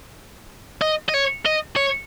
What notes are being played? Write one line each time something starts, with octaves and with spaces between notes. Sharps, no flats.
D#5
D#5
C#5
D#5
C#5